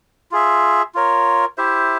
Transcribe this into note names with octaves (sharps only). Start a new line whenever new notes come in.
F4 G#4 E5
F4 A#4 C#5
E4 G4 C5 E5